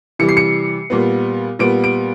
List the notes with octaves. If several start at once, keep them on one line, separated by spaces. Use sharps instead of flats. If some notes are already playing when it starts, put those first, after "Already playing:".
C3 E3 G3 C#7
C7
C#7
A#2 G3 B3
A#2 G3 B3 D7
D7